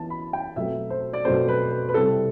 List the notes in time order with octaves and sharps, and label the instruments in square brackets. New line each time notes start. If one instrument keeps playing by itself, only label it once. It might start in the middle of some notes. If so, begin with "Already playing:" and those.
Already playing: [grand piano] E3 B3 E4 A5
B5
G5
B2 F#3 A3 C4 E5
C5
D5
B2 F#3 A3 C4 C5
B4
B4
B4
C3 G3 C4 E4 A4